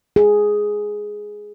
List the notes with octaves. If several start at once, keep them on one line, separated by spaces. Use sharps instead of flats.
G#4